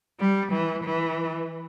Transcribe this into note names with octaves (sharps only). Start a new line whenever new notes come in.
G3
E3
E3